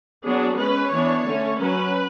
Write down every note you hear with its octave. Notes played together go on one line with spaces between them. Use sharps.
F#3 B3 D4 G#4
G#3 C#4 B4
E3 B3 D4 C#5
D3 A3 C#4
F#3 C#4 B4